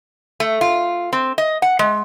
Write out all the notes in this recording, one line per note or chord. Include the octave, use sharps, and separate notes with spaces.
A3
F4
C4
D#5
F#5
G#3